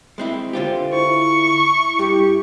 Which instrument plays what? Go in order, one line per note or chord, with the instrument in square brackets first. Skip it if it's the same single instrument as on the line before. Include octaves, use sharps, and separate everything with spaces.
[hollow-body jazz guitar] G#3 C4 E4
[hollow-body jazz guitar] D3 F4 G4 [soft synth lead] C5
[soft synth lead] E4 [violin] C#6
[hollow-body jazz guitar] G2 [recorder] G4